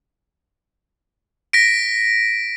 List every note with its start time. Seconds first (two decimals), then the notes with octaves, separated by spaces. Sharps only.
1.53 A#6 B6 D7